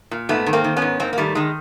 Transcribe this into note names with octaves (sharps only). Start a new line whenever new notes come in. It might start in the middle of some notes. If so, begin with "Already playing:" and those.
A#2
G#2 A3 B3
D#3
A#3 C4
D#3
B3 C#4
G#2
G#2 A#3 C4
A#3
D#3 G3 A3
D#3 G#3